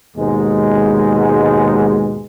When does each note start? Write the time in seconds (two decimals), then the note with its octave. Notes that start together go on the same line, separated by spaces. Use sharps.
0.17 D#2 G#2 B2 G#3